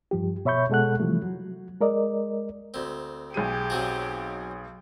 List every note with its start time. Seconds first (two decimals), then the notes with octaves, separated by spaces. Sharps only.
0.11 G2 F3 G4
0.45 B2 C#5 E5 B5 C#6 G6
0.70 B2 G#3 A4 F#5 F#6
1.00 C3 E3 F3 G3 A3
1.22 F#3
1.81 G#3 A#4 D5 D#5
2.74 D2 C4
3.34 B1 G4 G#4 D#7
3.70 F#3 C4 F#4